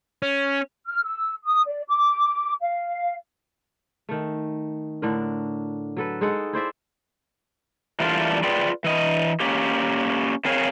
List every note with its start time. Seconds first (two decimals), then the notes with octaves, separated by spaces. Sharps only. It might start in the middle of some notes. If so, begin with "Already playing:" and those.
0.22 C#4
0.87 F6
1.04 E6
1.45 D#6
1.66 D5
1.88 D6
2.61 F5
4.09 D#3 A3
5.02 A2 D3 D4 A#4
5.97 F#3 A4 B4
6.21 G#3 D#4 A4 F#5
6.53 E4 C5 D5 E5
8.00 E3 G3 A3 A#3 D4 F4
8.44 F4 G#4 B4 D5 G5
8.84 E3 D#5
9.40 A#3 C#4 G4
10.45 A3 C4 G#4 A#4 C#5 F5